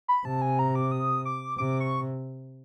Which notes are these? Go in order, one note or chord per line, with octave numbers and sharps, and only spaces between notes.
B5
C3 A5
G#5
A#5
D6
D#6
D6
C3 D6
C#6